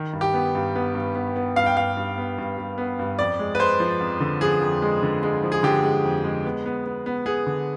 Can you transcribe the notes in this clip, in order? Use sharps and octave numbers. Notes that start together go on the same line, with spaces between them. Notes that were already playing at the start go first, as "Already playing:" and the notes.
Already playing: D#3
G2
G4
B3
G2
B3
G2
B3
B3
G2 F5
G5
G2 F5
G2
B3
G2
G2
B3
G2
F2 D5
G#3
B4
G#3 C5
F3
F2
D3
F3 G#4
F2
G#3
D3
G#3
F3
G#4
D3 G4
G#3
F2
G#3
B3
B3
B3
B3
B3 G#4
D3